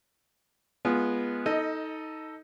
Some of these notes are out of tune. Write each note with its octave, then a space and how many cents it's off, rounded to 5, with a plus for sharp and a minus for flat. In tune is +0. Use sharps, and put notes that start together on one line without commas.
G#3 +5 B3 -15 F4 -10
D#4 +20 A4 +5 D#5 +0